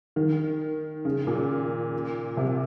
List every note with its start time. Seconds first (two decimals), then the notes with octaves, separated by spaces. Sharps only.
0.16 D#3
1.05 C#3
1.27 A#2
2.37 C3